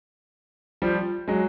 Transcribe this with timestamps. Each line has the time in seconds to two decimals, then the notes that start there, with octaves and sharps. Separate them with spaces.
0.82 F3 G3
1.28 F#3 G#3